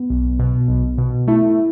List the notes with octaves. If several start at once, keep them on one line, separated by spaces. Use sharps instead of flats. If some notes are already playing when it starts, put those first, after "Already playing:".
Already playing: B3
B1
B2
B1
B2
A3 E4